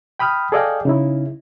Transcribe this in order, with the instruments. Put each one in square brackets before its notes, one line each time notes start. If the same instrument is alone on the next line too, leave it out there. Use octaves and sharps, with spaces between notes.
[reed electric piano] G5 B5 D#6 F6
G#4 A4 D5 D#5 F5 G5
C#3 D#4 E4